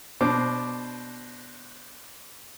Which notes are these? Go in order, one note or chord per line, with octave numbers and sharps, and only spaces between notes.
B2 D4 C5 D6